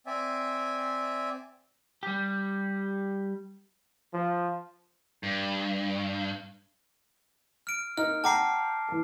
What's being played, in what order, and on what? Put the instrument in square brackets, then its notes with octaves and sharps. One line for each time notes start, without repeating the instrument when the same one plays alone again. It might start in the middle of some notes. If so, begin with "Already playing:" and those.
[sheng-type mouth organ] C4 D5 E5 G#5
[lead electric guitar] G3 G4
[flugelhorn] F3
[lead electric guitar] G2
[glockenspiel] F6 D7
[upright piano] A#3 D#4 [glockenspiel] F6
[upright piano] F#5 G5 A#5 [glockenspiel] A5 D6 C7
[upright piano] E3 A5